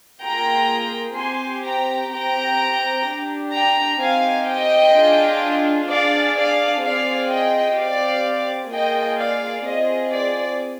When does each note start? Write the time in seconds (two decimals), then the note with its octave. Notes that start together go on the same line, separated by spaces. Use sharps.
0.23 A#3 F4 G#4 G5 A#5
1.17 C4 G4 G#5 C6
1.65 G5 A#5
2.12 C4 G4 G5 A#5
3.06 D4 G4
3.53 G5 A#5
4.00 C4 D#4 G4 F5 G#5
4.47 D#5 G5
4.95 D4 F4 G#4
5.88 D4 G#4 D5 F5
6.35 D5 F5
6.83 C4 F4 G#4 D5 F5
7.30 D#5 G5
7.77 C4 G4 D5 F5
8.71 A#3 F4 G#4 D#5 G5
9.18 D5 F5
9.65 C4 F4 G#4 D#5
10.13 D5